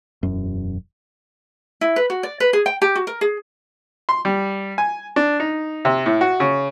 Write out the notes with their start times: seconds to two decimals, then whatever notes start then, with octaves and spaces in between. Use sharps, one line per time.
0.23 E1 F#2
1.81 E4
1.96 B4
2.10 F#4
2.23 D5
2.40 B4
2.53 G#4
2.66 G5
2.82 G4
2.95 F#4
3.07 A#4
3.21 G#4
4.09 C6
4.25 G3
4.78 G#5
5.16 D4
5.40 D#4
5.85 C3
6.06 A2
6.21 F#4
6.40 C#3